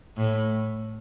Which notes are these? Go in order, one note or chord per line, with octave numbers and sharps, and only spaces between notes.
A2